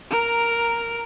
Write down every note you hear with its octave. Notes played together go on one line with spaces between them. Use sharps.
A#4 A#5